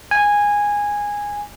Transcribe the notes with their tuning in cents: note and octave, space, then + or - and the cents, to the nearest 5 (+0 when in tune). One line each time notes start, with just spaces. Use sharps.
G#5 -10